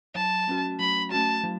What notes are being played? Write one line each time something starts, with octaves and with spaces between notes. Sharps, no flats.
F#3 A5
A3 C#4 F#4
F#3 B5
A3 C#4 F#4 A5
F#3